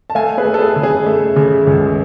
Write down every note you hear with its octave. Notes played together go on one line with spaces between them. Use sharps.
A5
A3 F5 G#5
G#4 B4
A3
A4
G#4
C#3
G#4
A3
C#3
C#2